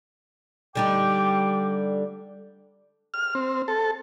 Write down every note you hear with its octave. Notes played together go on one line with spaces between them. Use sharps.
D3 G3 D#4 G5 D6
F6
C4
A4